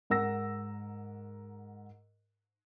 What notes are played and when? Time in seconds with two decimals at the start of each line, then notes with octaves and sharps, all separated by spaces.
0.10 G#2 A#4 F#5 E6 A#6